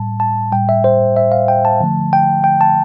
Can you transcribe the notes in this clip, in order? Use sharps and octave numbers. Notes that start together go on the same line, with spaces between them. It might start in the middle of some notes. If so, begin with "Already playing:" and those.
Already playing: A2 G3 A5
A5
A2 G3 G5
E5
C5
E5
F5
G5
A5
D3 F3 A3
G5
G5
A5